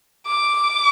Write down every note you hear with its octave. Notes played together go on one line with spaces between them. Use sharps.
D6